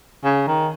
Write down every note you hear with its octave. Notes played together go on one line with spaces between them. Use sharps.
C#3
D#3